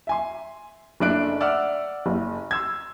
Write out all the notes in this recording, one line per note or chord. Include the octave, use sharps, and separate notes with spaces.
E5 G#5 C6
F#1 A3 D4 E5 F#6 D7
D5 E5 F#5 E6 F6
F#1
C6 E6 G#6